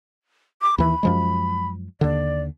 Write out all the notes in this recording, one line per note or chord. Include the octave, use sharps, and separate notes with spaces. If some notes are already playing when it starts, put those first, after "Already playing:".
D6
D#2 E3 B5
F#2 F3 G#3
D#2 D3 D5